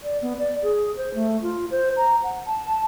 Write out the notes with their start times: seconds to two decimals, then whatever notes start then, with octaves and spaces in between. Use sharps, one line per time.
0.03 D5
0.22 B3
0.39 D5
0.63 G#4
0.96 C5
1.14 A3
1.42 F4
1.71 C5
1.97 A#5
2.23 F#5
2.46 A5